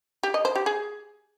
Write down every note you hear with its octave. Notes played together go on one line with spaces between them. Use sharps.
G4
D#5
C5
G4
G#4